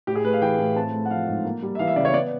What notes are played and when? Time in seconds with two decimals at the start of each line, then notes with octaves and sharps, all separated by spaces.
0.07 A2 G4
0.15 G#4
0.24 A3 B4
0.33 F5
0.42 E3 G5
0.59 A2
0.76 C4 A5
0.93 A3
1.05 F#5
1.11 F3 F5
1.28 G#2
1.45 A#3
1.63 G3
1.75 E5
1.79 E3 F5
1.87 E5
1.96 C#3 D5
2.05 C#5
2.13 B3 D5